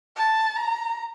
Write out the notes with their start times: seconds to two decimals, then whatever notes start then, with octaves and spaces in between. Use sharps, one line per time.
0.16 A5
0.56 A#5